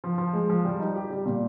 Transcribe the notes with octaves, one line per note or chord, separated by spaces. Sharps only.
F3
F3
G#3
F3
G3
D#4
G4
G3
A#2